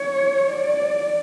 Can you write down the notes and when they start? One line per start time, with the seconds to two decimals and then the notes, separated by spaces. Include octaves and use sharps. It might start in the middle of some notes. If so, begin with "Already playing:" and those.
Already playing: C#5
0.49 D5